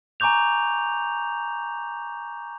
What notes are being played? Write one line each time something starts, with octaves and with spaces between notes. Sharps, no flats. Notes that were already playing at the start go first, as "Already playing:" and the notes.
G#5 A#5 C#6 D6 G6 F7